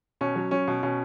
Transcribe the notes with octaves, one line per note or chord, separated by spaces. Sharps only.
B2 C#4
F#3
F#3 C#4
B2
B2 C#4